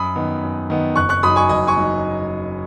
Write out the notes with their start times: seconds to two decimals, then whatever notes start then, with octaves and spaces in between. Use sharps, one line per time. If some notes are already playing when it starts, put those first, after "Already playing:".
Already playing: F#2 B5 D#6
0.16 D#3 B3
0.43 F#2
0.70 D#3 B3
0.96 F#1 C#6 F#6
1.09 C#6 F#6
1.23 F#2 F#3 D#4 B5 D#6
1.36 G#5 C#6
1.49 F#1 D#5 G#5
1.67 G#5 C#6
1.77 F#3 D#4